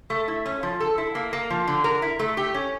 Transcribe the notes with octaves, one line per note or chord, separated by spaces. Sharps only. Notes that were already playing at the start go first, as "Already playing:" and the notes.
A3
E4
C#4
F3
A4
E4
A#3
A#3
F3
D3
A#4
E4
A3
G4
C#4